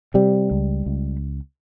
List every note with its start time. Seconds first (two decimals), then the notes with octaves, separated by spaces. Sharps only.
0.14 C3 G3
0.51 C#2
0.86 C#2